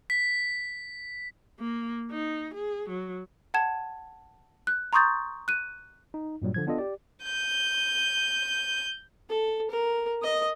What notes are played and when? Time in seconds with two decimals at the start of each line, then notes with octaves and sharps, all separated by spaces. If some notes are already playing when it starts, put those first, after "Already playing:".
0.10 B6
1.60 A#3
2.11 D#4
2.54 G#4
2.89 F#3
3.54 F#5 A5 G#6 E7
4.67 F#6
4.93 A#5 C6 C#6 D#6 G6 A6
5.48 F#6 D#7
6.14 D#4
6.42 G2 A#2 F#3 G3
6.54 D3 F3 G#6
6.67 B3 D4 F4 A4 D#5
6.78 G4 D5
7.23 G6 D#7
9.29 A4
9.70 A#4
10.23 D#5 D#6